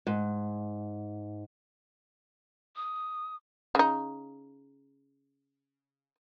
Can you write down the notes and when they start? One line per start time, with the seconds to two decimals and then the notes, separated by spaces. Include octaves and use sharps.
0.07 G#2
2.76 D#6
3.75 C#3 D#4